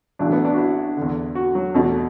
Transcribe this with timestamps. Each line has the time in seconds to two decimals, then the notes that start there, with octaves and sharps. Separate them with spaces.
0.19 B1 A2 E3 D4
0.32 B3
0.45 D4
0.54 F#4
0.58 E4
0.97 E2 D3
1.35 F#4
1.55 F#3
1.74 E2 B2 A3